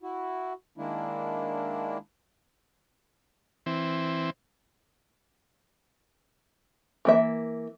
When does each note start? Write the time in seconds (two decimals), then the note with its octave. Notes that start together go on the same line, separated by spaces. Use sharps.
0.03 E4 F#4
0.78 D#3 G#3 A#3 D4 E4
3.66 E3 C4
7.05 E3 A#3 E5